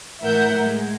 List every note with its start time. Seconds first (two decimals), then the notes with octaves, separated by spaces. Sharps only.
0.21 A2 E3 A#4 E5 F#5 G6
0.57 G#3